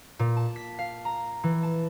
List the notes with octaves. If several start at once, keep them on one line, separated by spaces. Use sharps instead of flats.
A#2
A5
B6
F5
A#5
E3
A5